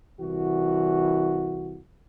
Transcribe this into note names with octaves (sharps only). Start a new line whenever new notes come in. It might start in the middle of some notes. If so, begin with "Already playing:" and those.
C2 E3 F#4